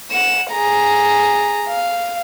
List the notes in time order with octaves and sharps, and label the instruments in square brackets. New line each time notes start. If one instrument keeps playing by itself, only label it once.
[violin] F#5 E7
G#4 A#5
F5